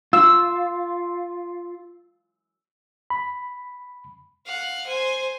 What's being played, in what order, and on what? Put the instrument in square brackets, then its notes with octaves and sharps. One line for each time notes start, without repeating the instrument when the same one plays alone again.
[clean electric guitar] F4 [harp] E6
[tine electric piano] B5
[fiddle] F5 F#5
C5 G#5